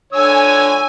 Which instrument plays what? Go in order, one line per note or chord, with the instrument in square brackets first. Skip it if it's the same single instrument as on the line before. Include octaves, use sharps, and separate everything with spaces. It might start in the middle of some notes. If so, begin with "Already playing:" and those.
[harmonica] D3 C#5 E6 [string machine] G#5